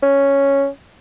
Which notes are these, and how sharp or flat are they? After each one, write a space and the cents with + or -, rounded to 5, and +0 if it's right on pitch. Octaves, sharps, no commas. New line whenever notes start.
C#4 +0